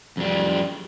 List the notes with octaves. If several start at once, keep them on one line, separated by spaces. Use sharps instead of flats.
F2 G3